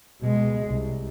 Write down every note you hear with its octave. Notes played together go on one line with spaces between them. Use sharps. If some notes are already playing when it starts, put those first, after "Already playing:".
B2 G#3
C2